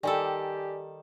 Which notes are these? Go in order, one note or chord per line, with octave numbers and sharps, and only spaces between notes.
D#3 G3 G4 A4 D5 G5 G#5